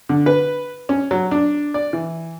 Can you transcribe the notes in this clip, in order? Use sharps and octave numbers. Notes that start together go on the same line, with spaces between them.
D3
B4
C#4
F#3
D4
D5
E3